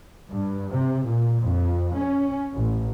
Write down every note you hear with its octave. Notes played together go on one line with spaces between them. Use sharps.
G2
C3
A#2
F2
C#4
A1